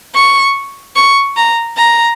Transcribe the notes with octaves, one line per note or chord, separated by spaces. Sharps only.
C#6
C#6
A#5
A#5